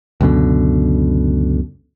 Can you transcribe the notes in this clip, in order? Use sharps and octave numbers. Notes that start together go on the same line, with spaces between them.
C#2 F#2 B2 D3